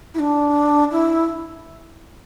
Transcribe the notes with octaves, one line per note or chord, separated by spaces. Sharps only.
E4
D4
E4